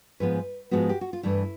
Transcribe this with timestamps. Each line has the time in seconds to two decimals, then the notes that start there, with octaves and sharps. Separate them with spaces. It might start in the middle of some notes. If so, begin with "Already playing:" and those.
0.20 G#2 F3 G#3 B3 B4
0.71 G#2 F3 G#3 B3 F#4
0.89 G4
1.01 F#4
1.13 F4
1.23 G2 E3 A3 E4